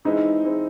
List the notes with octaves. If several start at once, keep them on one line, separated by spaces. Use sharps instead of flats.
E3 G#3 C4 D#4 E4
E3 G#3 C4 E4